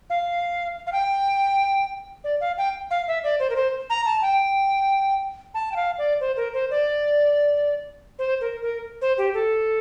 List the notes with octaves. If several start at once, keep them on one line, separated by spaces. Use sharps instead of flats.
F5
F5
G5
D5
F5
G5
F5
E5
D5
C5
A#4
C5
A#5
A5
G5
A5
G5
F5
D5
C5
A#4
C5
D5
C5
A#4
A#4
C5
G4
A4